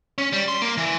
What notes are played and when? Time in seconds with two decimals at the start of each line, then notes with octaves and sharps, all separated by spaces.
0.18 C#4
0.33 G3
0.48 C6
0.62 A#3
0.77 E3